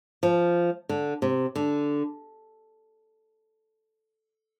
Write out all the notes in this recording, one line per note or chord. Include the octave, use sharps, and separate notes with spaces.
F3
D3
C3
D3